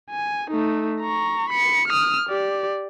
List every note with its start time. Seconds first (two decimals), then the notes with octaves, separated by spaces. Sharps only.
0.11 G#5
0.50 A3 D#4
1.00 A#5 C#6
1.50 B5 C#7
1.88 D#6 F6
2.29 G4 D5